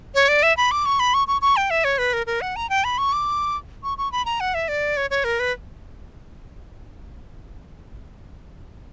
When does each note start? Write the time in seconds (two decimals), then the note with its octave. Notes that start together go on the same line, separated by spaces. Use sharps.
0.15 C#5
0.29 D5
0.43 E5
0.57 B5
0.71 D6
0.86 C#6
1.00 B5
1.14 C#6
1.28 C#6
1.42 C#6
1.57 G5
1.70 E5
1.84 C#5
1.98 B4
2.13 A#4
2.27 A#4
2.41 F#5
2.56 A#5
2.70 G5
2.84 B5
2.98 C#6
3.13 D6
3.83 C#6
3.98 C#6
4.12 B5
4.25 A#5
4.40 F#5
4.54 E5
4.68 D5
4.97 C#5
5.10 C#5
5.24 A#4
5.40 B4